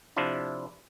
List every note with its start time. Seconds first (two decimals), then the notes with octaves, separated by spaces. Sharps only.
0.17 C3 F3 D4 E4 F4